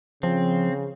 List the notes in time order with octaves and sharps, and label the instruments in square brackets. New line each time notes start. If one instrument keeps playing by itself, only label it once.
[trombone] C#3 [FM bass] F3 [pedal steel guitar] C4